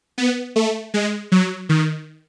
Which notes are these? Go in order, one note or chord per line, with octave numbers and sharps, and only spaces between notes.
B3
A3
G#3
F#3
D#3